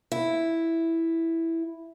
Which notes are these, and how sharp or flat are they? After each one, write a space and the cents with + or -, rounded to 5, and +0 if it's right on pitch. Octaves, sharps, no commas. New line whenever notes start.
E4 +0